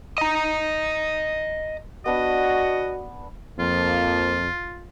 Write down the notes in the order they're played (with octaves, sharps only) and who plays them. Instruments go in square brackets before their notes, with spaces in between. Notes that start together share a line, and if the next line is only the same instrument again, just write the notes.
[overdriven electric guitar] D#5 A#5
[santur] B3 D4 [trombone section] F#4 [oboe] D#5
[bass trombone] F2 [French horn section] F3 A#3 [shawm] F4